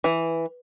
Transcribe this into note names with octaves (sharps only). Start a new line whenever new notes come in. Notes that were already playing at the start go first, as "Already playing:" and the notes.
E3